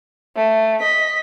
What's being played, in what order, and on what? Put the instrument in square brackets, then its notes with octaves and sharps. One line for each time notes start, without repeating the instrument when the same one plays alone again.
[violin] A3
D#5 B6